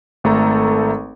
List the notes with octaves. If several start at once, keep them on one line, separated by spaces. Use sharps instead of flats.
G#1 A3 A4 A#5